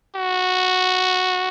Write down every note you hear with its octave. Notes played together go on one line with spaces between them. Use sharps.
F#4